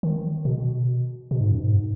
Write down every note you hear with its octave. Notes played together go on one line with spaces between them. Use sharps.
D#3
B2
B2
G#2
F#2
G#2